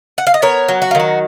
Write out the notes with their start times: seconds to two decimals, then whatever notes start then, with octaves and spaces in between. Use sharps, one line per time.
0.18 F#5
0.27 F5
0.34 D#5
0.42 B3 A#4 C#5
0.68 F#3
0.82 F#4
0.91 F4
0.95 D#3 F#4